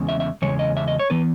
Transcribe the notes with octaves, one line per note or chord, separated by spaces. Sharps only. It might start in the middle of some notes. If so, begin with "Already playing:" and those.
Already playing: E2 C#3 G#3
E5
E5
E2 C#3 G#3 C#5
D#5
E5
D#5
C#5
E3 B3 B4